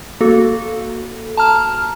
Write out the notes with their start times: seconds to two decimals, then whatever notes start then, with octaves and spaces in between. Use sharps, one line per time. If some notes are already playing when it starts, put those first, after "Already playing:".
0.21 A#3 F#4 A4
1.37 A5 A#5 F6